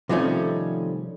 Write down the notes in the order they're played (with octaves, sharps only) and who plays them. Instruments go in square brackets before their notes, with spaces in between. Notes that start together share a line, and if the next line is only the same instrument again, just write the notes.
[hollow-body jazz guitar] C3 D#3 F3 G3 A3 C#4